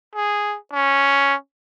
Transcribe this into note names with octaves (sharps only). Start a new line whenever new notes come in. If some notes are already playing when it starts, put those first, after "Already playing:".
G#4
C#4